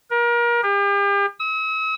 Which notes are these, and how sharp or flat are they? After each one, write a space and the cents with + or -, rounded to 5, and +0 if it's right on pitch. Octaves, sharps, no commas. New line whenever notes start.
A#4 +30
G4 +40
E6 -45